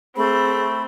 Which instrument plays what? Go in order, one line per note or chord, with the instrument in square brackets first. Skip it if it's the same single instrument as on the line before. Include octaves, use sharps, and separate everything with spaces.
[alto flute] A3 [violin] C4 [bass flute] G#4 [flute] B5